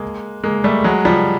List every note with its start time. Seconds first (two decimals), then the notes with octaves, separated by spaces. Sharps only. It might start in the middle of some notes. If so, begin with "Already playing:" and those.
Already playing: G#3 A#3
0.44 G#3 A#3
0.64 G3 A3
0.84 F#3 G#3
1.05 F3 G3